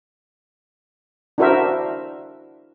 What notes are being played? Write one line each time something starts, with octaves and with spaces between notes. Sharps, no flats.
D4 E4 F#4 A#4 C5 E5